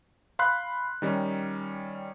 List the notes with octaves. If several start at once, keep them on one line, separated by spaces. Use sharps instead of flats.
F5 B5 C6 F#6
D#3 G3 C#4